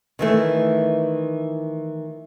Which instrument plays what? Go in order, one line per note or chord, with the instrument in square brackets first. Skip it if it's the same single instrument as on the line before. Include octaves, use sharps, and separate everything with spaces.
[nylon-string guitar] D#3 E3 A3